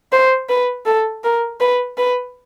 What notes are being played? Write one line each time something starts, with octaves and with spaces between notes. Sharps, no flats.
C5
B4
A4
A#4
B4
B4